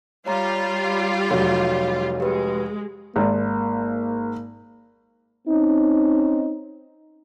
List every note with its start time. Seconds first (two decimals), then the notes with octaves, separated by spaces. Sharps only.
0.26 G3 F4 C#5 A#5
1.31 F1 F#3 C#5
2.20 G#3 G4 B4
3.16 G#1 A#3
5.48 C4 C#4 D#4